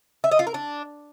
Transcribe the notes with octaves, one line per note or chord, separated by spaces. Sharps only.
E5
D#5
F4
A#4
D4